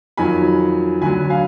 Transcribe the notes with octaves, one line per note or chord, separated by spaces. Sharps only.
F2 D#3 F#3 G#5 B5
D2 D3 F#3 G#5 B5
F5 G#5